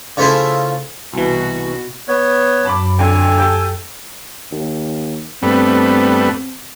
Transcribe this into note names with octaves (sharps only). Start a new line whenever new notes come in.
C#3 F3 A3 E4 C5
C2 B2 E3 F#4
B3 C#5
F#2 A5 B5 D6
F2 D3 A4 G#5
G4 G5 A5
D#2
G2 A3 B3 C4